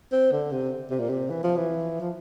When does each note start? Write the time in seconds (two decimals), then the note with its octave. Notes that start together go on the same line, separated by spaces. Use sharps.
0.12 C4
0.32 D3
0.51 C3
0.90 C3
0.99 A#2
1.10 C3
1.30 E3
1.43 F3
1.56 E3
2.00 F3